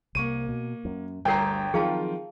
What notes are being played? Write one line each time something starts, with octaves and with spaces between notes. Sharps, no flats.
C2 A#3 C#6 D#7
B2
F#2
G1 D2 G3 A#4 C#5 G5 A#5 C7
D#3 F3 F#3 C4 F4 G#4 F5 A5